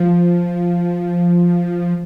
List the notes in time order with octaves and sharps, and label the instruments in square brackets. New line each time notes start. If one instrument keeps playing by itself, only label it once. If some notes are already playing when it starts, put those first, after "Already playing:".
Already playing: [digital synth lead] F3